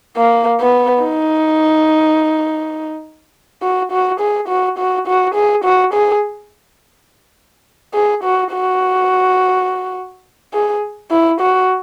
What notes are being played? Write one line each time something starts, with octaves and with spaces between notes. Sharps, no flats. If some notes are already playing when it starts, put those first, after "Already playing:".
A#3
B3
D#4
F#4
F#4
G#4
F#4
F#4
F#4
G#4
F#4
G#4
G#4
F#4
F#4
G#4
E4
F#4